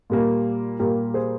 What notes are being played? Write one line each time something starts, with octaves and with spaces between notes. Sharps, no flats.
A#2 G3 A#3
A#2 G3 A#3 G4 A#4
G#4 C5